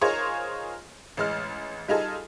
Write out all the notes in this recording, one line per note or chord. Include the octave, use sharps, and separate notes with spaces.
D#4 F4 G#4 A#4 C5 C#5
A1 G#3 F6
G3 D#4 F4 G#4 A4